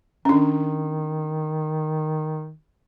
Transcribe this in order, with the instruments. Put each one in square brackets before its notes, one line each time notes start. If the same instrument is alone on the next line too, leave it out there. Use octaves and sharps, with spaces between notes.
[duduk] D#3 [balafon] C#4 D4